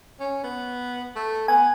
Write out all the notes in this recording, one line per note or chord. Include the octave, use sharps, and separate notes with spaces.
C#4
B3
A3
B3 G#5